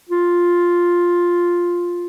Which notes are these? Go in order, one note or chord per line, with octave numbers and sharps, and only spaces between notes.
F4